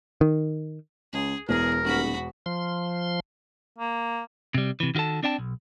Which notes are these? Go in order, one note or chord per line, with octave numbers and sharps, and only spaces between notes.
D#3
C#2 G#4
E1 E2 G#4 A#4
D#1 F#4 B5
F3 C6
A#3
C3 G3
C3 E3
D#3 F4 F#4 A4 A5
C4 D4 D5 G5 A5
B1